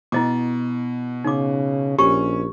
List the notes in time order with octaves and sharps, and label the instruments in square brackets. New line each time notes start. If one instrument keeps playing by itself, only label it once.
[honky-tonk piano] B2 [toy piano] E4 D#5 D6
[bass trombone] C#3 [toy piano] D#4 D6
[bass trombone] A#1 [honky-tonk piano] C#4 [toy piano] G4 C#6